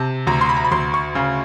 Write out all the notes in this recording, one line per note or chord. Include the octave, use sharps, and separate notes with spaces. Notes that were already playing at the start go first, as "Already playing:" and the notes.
Already playing: C3 A5
D2 A#5
C6
B5
A#5
B5
D2 C6
C#6
C#3